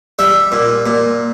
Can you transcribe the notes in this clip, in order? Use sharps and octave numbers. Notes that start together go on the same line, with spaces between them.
G3 E5
A#2
A#2